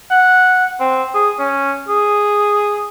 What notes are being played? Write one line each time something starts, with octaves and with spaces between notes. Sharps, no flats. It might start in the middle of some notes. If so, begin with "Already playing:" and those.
F#5
C4
G#4
C#4
G#4